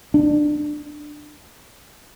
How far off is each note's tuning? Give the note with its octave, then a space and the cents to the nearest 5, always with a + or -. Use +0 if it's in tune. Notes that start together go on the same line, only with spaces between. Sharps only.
D4 +20